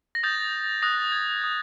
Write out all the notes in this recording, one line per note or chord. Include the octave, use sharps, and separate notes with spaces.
A#6
D#6 G6 A6
D#6 F#6 A#6
A6
G#6
D#6 G6